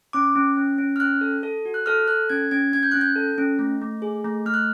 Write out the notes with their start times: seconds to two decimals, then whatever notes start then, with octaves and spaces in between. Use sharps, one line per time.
0.13 C#4 D6
0.36 C#4
0.57 C#4
0.78 C#4
0.96 F6
1.00 C#4 F#6
1.21 A4
1.43 A4
1.65 F#4
1.74 F#6
1.86 A4 F6
2.08 A4 F#6
2.30 C#4 G#6
2.51 C#4 G#6
2.73 C#4 G#6
2.83 G6
2.92 C#4 F#6
3.01 G6
3.16 A4
3.38 C#4
3.59 A3
3.82 A3
4.02 G#4
4.25 A3
4.46 A3 F6
4.54 F#6